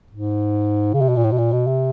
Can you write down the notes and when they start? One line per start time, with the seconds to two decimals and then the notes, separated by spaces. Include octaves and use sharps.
0.11 G#2
0.94 C#3
1.01 C3
1.09 B2
1.16 A#2
1.24 A2
1.32 B2
1.38 A#2
1.52 B2
1.67 C3